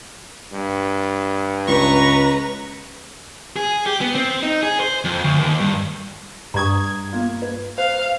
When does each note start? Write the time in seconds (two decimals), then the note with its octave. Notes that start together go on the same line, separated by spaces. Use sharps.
0.53 G2
1.67 C#2 B4 A#5 C#6
3.56 G#4
3.86 G4
4.01 B3
4.15 C4
4.42 D#4
4.63 G#4
4.80 C5
5.04 F2
5.24 D2
5.39 D#2
5.60 G2
6.54 G2 A#5 C#6 D#6 G#6
7.13 A#3 F4
7.42 B4
7.78 C5 F5